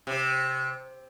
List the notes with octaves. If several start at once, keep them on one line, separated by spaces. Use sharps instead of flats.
C3